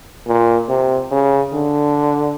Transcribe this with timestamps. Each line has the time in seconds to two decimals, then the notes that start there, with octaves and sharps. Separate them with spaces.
0.28 A#2
0.69 C3
1.12 C#3
1.53 D3